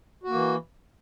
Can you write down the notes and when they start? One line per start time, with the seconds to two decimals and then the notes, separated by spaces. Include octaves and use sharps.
0.24 F#4
0.29 A#3
0.34 E3